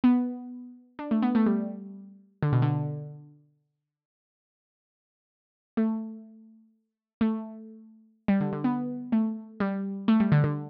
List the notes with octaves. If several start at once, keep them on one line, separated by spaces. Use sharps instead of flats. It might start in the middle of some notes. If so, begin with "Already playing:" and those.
B3
D4
A3
B3
A3
G3
D3
B2
D3
A3
A3
G3
D3
D3
B3
A3
G3
A3
G3
D3
D3